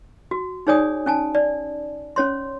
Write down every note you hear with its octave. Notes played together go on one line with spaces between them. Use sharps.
F#4
D#4 G#4 C#5 D5 G#5 D#6
C#4 G#5 A5
D5
C#4 C#5 C6